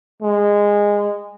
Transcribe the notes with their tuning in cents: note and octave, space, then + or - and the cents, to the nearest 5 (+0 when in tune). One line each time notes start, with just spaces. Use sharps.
G#3 -15